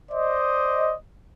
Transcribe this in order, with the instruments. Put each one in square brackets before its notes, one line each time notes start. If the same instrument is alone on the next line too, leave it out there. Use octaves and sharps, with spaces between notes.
[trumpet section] C5 D5 D#5